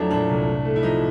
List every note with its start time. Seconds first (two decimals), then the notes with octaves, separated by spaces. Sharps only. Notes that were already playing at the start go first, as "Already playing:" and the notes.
Already playing: F2 F#3 A3 D4 E4
0.11 A#2 D4
0.29 C2
0.47 A2
0.65 A3
0.76 E4
0.83 F3 D#4